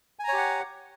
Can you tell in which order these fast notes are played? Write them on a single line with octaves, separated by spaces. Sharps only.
G#5 A#5 C#5 G4 F#5